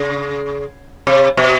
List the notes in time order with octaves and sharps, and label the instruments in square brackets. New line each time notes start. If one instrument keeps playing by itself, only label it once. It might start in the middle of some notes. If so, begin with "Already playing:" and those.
Already playing: [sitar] C#3
C3
B2